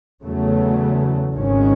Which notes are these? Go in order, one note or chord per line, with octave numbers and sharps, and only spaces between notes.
E2 C#3 F#3 A3
G#1 G#2 D#3 G#3 C#4